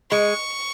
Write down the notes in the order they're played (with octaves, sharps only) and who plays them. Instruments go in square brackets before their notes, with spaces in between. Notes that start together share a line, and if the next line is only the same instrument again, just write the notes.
[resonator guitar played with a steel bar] G#3 [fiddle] C#6